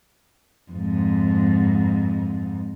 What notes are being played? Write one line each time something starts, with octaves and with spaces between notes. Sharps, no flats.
F2 G#2